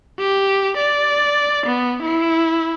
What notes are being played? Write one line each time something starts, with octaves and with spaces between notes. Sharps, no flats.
G4
D5
B3
E4